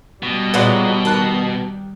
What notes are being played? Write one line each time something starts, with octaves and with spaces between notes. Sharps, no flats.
B2 G3
A#2 F#3 G#3 B3 F#4 D5
D#3 A5 F#6